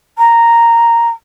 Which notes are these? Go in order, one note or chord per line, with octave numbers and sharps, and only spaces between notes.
A#5